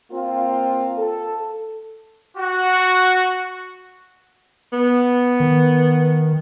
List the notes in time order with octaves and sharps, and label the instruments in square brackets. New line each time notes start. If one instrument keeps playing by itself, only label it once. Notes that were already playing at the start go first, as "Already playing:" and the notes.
[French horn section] A#3 C4 F4
A4
[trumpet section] F#4
[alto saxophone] B3
[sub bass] D#3